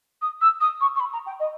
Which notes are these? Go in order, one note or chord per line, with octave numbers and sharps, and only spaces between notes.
D#6
E6
D#6
C#6
C#6
B5
A#5
G5
D#5